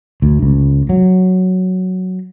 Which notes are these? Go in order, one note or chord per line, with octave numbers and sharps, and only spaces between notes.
D2
C#2
F#3